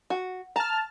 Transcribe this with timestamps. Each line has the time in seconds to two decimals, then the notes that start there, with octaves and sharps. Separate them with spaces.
0.10 F#4
0.56 A5 A#5 F6